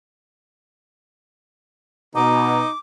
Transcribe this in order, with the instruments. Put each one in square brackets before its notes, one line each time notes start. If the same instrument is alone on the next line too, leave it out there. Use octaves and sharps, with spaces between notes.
[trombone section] B2 [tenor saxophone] D#4 [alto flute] A#5 [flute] D6